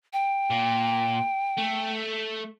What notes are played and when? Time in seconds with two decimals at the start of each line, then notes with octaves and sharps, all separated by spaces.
0.13 G5
0.50 A#2
1.58 A3